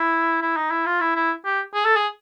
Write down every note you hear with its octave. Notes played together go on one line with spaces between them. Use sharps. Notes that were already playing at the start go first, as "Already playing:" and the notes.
Already playing: E4
E4
D#4
E4
F4
E4
E4
G4
G#4
A4
G#4